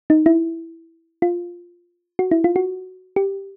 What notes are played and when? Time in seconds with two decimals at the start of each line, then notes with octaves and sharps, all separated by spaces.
0.10 D#4
0.26 E4
1.22 F4
2.19 F#4
2.31 E4
2.44 F4
2.56 F#4
3.16 G4